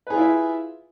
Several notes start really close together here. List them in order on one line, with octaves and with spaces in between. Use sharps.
B4 G#4 F4 E4 E5